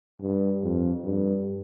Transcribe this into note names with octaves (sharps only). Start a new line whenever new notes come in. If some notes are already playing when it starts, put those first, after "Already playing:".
G2
F2
G2